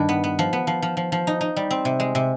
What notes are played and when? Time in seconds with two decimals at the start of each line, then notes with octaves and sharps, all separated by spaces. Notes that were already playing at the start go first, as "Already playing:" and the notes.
Already playing: G2 D#3
0.09 B3
0.24 B3
0.39 F3
0.53 B3
0.67 F3
0.82 F3
0.97 F3
1.12 F3
1.27 D#4
1.41 D#4
1.56 G3
1.71 C4
1.85 C3
2.00 G#3
2.15 C3